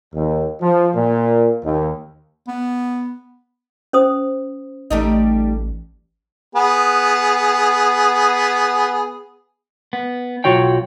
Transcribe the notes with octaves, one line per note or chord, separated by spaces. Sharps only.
D#2
F3
A#2
D#2
B3
C#4 C5 D#6
A1 G3 A3 D#4
B3 G#4
B3
B1 E3 F4 F#4 C#5 G5